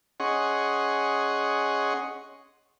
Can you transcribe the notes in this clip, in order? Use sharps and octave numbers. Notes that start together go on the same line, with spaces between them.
C#4 G#4 D#5 F#5 C6 C#6